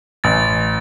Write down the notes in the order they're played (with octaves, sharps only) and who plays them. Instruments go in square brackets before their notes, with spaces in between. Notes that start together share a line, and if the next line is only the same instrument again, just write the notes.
[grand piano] A1 [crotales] A6